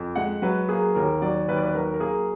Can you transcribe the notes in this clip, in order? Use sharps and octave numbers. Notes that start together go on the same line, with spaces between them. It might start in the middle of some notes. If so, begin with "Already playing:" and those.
Already playing: F2
G#3 F#5
F#3 B4
A#3 G#4
D#2 A#4
F#3 D5
D#2 B4
D5
B4
F#3 A#4
A#4
A#3 G#4